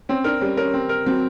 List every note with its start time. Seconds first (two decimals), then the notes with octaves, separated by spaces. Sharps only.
0.09 C4 C#4
0.24 D4 A#4
0.41 G3 C#4
0.57 C#4 A#4
0.74 C4
0.89 A#4
1.06 F#3 C4